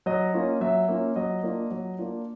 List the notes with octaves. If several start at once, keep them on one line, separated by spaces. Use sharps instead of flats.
F#3 D#5
A#3 C#4 F4
F#3 E5
A#3 C#4 F4
F#3 D#5
A#3 D4 F4
F#3
A#3 D4 F4